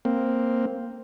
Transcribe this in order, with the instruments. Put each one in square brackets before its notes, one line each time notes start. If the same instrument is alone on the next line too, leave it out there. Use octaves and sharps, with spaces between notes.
[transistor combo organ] A#3 C4